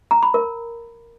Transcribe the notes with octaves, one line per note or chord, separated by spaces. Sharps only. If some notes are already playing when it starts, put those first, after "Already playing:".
A#5
B5
A#4